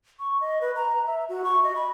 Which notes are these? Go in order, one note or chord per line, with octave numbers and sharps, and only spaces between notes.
C#6
D#5
B4
A#5
E5
F#4
C#6
D#5
B5